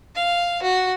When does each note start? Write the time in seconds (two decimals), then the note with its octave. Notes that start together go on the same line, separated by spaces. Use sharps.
0.15 F5
0.63 F#4